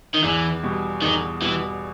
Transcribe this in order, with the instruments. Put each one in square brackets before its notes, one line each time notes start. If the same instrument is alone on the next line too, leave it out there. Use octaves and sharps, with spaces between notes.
[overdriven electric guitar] D#3
[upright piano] E2 [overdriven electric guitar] E3
[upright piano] B2 G3
[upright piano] E2 [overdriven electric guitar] D#3
[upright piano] B2 G3 [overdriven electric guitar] E3